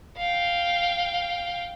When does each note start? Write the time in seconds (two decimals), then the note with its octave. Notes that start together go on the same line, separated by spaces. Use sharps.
0.17 F5 G5